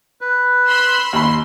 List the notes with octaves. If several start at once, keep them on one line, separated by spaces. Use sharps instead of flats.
B4
B5 C6 E6
D#2 B5 C6